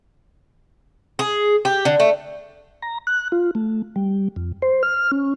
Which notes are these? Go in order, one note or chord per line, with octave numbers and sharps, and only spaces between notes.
G#4
G4
D3
A3
A#5
F#6
F4
A3
G3
F2
C5
F6
C#4